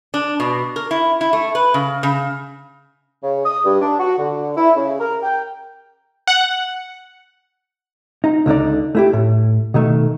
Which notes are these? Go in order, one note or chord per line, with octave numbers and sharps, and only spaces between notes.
D4
B2
A#4
E4
E4
A3
B4
C#3
C#3
C#3
D#6
G2
D4
F#4
D3
E4
C#3
A#4
G5
F#5
D#4
C#2 D3 D#4 D5
A3 E4 G4
A2
B2 D#3 A3